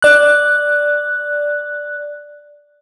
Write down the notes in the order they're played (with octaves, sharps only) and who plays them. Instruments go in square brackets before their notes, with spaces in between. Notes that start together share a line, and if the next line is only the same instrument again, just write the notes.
[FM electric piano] D5 F#6